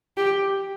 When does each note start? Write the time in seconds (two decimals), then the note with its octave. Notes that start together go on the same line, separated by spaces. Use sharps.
0.17 G4